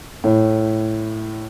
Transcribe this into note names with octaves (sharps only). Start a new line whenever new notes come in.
A2